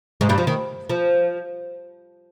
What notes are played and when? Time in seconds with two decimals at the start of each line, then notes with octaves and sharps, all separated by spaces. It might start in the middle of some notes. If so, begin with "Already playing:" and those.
0.21 G#2 G#3
0.29 G2 G3
0.38 F3
0.47 D#3
0.90 F3